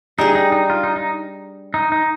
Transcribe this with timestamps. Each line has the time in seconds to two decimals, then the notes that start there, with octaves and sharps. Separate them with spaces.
0.18 G3 D4 D#4 G#4
0.35 D#4
0.52 D#4
0.70 F4
0.83 D#4
0.96 D#4
1.74 D#4
1.92 D#4